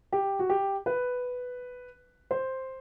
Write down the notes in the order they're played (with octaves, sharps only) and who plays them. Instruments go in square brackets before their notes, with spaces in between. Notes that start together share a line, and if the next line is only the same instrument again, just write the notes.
[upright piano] G4
F#4
G4
B4
C5